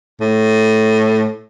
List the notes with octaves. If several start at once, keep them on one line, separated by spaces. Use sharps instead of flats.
A2